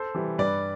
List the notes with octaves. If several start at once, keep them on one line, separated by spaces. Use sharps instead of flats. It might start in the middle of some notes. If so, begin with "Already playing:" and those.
Already playing: A4 C5
E3 G3
G2 B4 D5